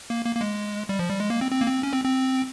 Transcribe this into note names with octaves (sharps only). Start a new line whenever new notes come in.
A#3
A#3
A#3
G#3
G3
F3
G3
G#3
A#3
C4
C4
A#3
C4
C#4
C4
C4